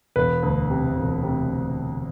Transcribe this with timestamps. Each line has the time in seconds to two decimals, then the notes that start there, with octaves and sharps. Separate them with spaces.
0.16 E1 B4
0.43 D2
0.70 C3
0.96 E1
1.23 C3